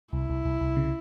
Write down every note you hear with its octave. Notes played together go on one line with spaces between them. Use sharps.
C2 E4
C2
C2
C2
C#3